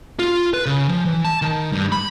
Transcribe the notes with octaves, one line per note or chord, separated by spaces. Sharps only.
F4
B4
C#3
F3
E3
A5
D#3
G2
B5